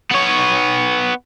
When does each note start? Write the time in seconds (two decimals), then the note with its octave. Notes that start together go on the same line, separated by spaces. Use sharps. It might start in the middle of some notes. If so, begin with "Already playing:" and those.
0.11 B3 C#5